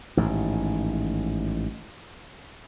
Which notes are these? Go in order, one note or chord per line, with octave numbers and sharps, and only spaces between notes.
A1 G#2 D#3